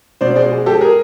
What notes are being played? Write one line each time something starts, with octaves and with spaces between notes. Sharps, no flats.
B2 C5 D5
G#3 C5 D5
G#3
G#3 G4 A4
G#4 A#4